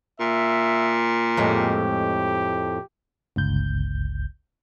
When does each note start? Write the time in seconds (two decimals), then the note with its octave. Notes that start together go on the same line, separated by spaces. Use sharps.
0.20 A#2 E5
1.37 F2 A2 G#3 G4
3.36 G1 C#2 G6